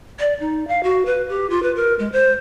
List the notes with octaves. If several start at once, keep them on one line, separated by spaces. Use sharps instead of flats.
D5
D#4
F5
F#4
B4
G4
F4
B4
A#4
G#3
C5